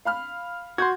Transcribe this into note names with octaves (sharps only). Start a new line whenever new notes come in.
F5 B5 F6
F#4 C6 G6 G#6